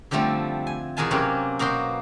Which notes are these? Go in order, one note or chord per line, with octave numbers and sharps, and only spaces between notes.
D3 F3 G3 A3 C4
G#5
E2 B2 A#4 B4 G#5 A5
C3 F#3 A#3 C4 C#4
B2 A#3 F#4 C5 C6